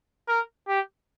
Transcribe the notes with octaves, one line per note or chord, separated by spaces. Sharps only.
A#4
G4